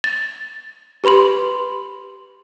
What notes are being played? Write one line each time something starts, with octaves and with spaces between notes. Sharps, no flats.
A6
G4 B4 B5 C6 F#7